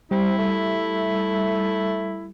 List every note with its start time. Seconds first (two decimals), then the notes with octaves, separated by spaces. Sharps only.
0.11 G3 C4 E4
0.39 A3